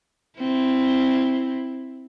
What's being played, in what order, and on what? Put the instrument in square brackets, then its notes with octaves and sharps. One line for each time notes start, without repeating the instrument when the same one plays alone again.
[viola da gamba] C4 E4